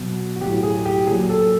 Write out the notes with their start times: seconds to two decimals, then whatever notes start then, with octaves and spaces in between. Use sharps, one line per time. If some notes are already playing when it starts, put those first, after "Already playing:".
Already playing: B2 F#3
0.36 F#4
0.41 A2 F#3 G4
0.63 G#4
0.85 G4
1.07 A#2 F#3 G#4
1.29 A4